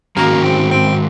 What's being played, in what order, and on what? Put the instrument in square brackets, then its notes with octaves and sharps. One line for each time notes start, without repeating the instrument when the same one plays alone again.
[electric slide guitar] G#2 D#3 G#3 C#4 F#4 [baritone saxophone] A#3
[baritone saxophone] C4
C4